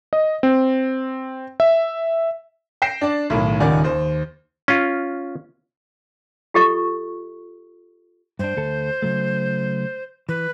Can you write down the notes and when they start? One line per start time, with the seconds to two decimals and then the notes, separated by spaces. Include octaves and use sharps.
0.13 D#5
0.43 C4
1.60 E5
2.82 G5 A#6 C7 E7
3.01 D4 D5
3.30 B1 A2 D#3
3.60 D#1 C#2 D#3 D5 F#5 G#5
3.84 D#2 C5
4.68 C#4 F4
6.54 F4 G4 A4 D#5 C#6
8.39 G2 D4 C5
8.57 D2 A4 A5
9.02 C#3 F#3 A3
10.29 E3 B4